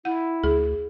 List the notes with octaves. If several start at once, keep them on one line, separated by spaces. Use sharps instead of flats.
E4 F#5
D2 G#4